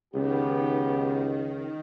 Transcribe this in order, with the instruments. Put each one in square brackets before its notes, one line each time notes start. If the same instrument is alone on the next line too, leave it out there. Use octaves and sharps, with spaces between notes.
[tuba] C#2 [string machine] D#3 [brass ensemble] B3 G4